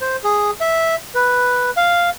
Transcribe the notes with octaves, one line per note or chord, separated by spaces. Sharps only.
C5
G#4
E5
B4
F5